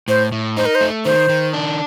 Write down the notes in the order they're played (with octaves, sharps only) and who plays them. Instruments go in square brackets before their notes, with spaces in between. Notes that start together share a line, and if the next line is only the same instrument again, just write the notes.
[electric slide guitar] A2 [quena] C5
[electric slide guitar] A2
[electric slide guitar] D#4 [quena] C5
[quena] A#4
C5
[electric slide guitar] A3
[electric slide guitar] D#3 [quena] C5
[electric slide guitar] D#3
D4